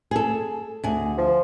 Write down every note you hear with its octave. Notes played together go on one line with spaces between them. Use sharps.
G#4 A4
D2 G#4
F3